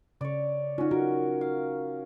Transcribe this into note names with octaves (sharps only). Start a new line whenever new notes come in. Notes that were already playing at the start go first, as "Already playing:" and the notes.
C#3 C#5 D5
C#4 D#4 F4 F#4
F#4 A#4
F5